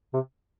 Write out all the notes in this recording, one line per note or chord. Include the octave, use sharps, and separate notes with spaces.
C3